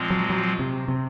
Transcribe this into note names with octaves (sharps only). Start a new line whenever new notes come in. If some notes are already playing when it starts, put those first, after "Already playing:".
Already playing: A#2 F3 G#3 C4 F4
F#3
F#3
C3
C3